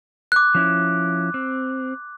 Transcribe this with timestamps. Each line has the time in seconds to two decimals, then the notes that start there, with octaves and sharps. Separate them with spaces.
0.32 D6 F#6
0.55 F3 C#4 E4
1.34 C4